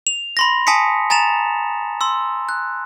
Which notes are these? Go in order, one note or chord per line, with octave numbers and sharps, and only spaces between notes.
F7
B5 C6 A#6
G#5 A5 D#6 B6 C#7
G#5 A#5 A6 E7 F7
C6 E6
F#6